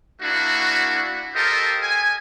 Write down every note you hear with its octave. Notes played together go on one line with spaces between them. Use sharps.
A#3 D4 E4 F#4
F4 G4 A4 A#4 C5 D#5
G#5